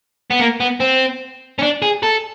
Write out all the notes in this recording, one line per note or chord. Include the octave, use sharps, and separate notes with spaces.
B3
A#3
B3
C4
C#4
D4
G#4
A4